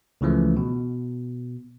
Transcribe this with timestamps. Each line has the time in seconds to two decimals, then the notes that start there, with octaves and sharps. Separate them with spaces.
0.21 C#2 C#3 E3 F3 A3
0.57 B2